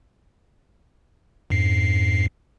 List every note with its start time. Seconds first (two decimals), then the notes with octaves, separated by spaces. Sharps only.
1.50 F2 G#2 C7